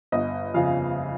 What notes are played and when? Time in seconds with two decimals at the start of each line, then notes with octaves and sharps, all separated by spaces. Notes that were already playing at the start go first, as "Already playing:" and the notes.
0.12 G1 D#5
0.54 F2 C#3 F3 F5